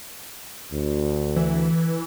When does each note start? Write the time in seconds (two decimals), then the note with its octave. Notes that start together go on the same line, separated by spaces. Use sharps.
0.72 D2
1.36 E3